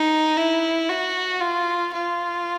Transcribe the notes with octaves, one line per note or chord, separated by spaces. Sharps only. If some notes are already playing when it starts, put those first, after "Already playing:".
Already playing: D#4
E4
F#4
F4
F4